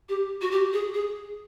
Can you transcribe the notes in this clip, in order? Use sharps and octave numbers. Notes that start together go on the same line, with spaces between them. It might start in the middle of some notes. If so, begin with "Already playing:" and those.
G4
F#4
G4
G#4
G#4